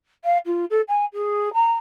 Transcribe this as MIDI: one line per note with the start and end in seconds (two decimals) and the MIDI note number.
0.24 0.38 77
0.46 0.65 65
0.70 0.81 69
0.88 1.05 80
1.14 1.53 68
1.54 1.73 82